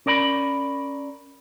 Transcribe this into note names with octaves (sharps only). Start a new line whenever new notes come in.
C#4 A#4 D5 A#5 B5